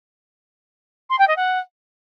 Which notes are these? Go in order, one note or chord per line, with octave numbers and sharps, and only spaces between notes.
C6
G5
D#5
F#5